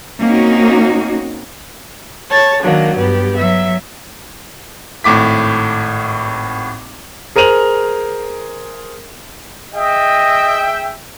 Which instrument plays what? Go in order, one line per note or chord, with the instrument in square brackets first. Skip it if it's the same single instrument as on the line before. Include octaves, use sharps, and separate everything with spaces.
[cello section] A#3 C4 C#4 D#4 F#4
[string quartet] C#5 A5 A6
D#3 F#3 A#3 D4
G2 B3 G4
F#3 E5
[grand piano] G#1 A2 D6 B6
G#4 A#4 C5 D#7 F7 F#7
[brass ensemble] G#4 E5 G5 [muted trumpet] D#5